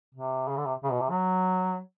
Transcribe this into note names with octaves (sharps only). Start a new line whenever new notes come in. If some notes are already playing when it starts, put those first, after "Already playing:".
C3
C#3
D3
C3
C#3
B2
C3
F#3